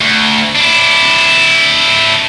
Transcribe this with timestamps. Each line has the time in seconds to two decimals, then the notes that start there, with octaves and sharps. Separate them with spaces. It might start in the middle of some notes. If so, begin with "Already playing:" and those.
0.01 D2
0.56 D4 E4